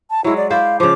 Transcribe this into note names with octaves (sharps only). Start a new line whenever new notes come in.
A5
F#3 G#3 E4
D5
E4 C5 D5 F5
C#3 F3 D6